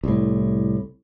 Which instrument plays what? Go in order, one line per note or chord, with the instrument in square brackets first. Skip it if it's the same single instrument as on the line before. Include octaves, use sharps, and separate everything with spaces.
[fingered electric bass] C2 A2